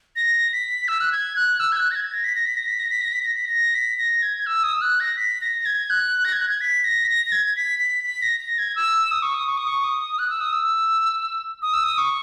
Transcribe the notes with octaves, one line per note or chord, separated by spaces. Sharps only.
A#6
B6
E6
F#6
G#6
F#6
E6
G#6
F#6
A#6
G#6
A#6
B6
A#6
B6
A#6
B6
A#6
B6
A#6
B6
A#6
B6
A#6
B6
A#6
G#6
E6
D#6
E6
F#6
A#6
B6
A#6
A#6
G#6
F#6
A#6
G#6
F#6
G#6
B6
A#6
B6
A#6
A#6
G#6
B6
B6
B6
A#6
A#6
G#6
E6
D#6
C#6
D#6
C#6
D#6
C#6
D#6
F#6
E6
D#6
E6
D#6
E6
D#6
C#6